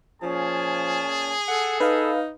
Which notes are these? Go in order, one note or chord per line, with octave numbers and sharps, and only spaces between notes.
A#2 F3 C#4 G#4 A5
A4 F#5
D#4 B4 F5